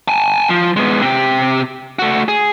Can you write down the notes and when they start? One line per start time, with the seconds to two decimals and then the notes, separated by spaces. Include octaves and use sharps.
0.08 G#5 A5
0.49 F3
0.77 G#3 B3
1.02 C3 G4
1.99 A3 F#4
2.28 G#4